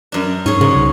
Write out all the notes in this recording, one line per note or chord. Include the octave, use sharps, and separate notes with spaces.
F#2 D4
G#2 C#4 G#4
G#2 C#3
C2